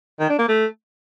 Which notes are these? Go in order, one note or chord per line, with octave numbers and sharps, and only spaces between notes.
D#3
D4
A#3
A3